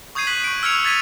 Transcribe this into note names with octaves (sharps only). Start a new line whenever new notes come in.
C#6 D#6 G6 G#6 C7 D#7
F#6 B6 F#7
C#6 D7
E6 F6 G#6 C#7 F7
G#6 A6 B6 C#7 D#7